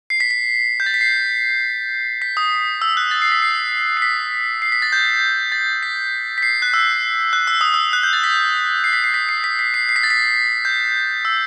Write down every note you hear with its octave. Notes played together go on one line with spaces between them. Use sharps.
C7
B6
B6
G6
A6
B6
C7
B6
D#6
E6
F#6
A6
C7
B6
C7
C7
B6
C7
B6
A6
G6
A6
B6
B6
C7
F#6
E6
F#6
E6
D#6
E6
F#6
G6
A6
B6
C7
B6
C7
B6
C7
B6
B6
C7
C7
B6
A6
B6
G6
E6